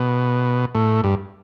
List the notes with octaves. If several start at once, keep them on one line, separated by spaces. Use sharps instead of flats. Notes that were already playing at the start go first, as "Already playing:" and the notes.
Already playing: B2
A2
G2